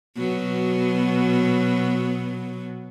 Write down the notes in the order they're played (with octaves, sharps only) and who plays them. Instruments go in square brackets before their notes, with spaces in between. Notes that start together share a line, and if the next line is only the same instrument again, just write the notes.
[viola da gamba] B2 F#3 B3